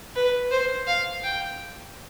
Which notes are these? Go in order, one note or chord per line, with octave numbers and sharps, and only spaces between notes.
B4
C5
F5
G5